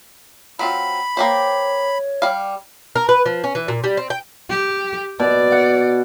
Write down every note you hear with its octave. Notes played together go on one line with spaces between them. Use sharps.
F#3 C4 F4 B5
A#3 G4 C5 C#5
G3 F5
A#4
B4
F3
C#4
E3
A#2
G3
C4
G5
G4
B2 D5
F#5